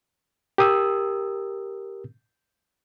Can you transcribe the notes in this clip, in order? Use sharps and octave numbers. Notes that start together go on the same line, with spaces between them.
G4 A#4 D#6 E6